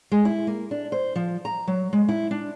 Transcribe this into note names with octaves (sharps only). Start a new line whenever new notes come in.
G#3
E4
A#3
D4
C5
F3
A#5
F#3
G#3
E4
D4